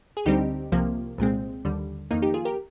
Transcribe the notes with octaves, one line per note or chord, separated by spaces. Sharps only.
G#4
D2 D3 G3 C4 D#4 G4
C2 C3 F3 A#3
C2 A#2 G#3 C4
D#2 D3 G3
F2 D#3 A#3 D#4
D#4 G4
F4 G#4
G4 A#4